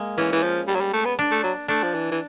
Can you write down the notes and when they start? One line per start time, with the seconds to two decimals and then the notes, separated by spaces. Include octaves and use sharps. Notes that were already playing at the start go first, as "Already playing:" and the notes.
Already playing: G#3 A#3
0.18 E3 C#4
0.33 E3
0.43 F3
0.68 G3
0.75 F#3
0.81 G3
0.93 A3
1.05 B3
1.19 D4
1.31 A3
1.43 F#3
1.68 A3 D4
1.83 F3
1.94 E3
2.12 E3